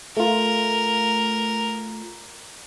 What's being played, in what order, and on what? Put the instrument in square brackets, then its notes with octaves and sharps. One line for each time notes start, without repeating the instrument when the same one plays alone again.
[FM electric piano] A3 F4 [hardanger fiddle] A#4